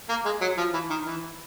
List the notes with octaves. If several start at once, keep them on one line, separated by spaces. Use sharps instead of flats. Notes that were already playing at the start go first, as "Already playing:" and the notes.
A#3
G#3
F#3
F3
E3
D#3
E3